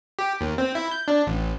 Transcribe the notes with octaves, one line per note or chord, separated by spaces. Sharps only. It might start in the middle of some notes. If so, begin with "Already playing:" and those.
G4
D#2
C4
E4
G6
D4
A1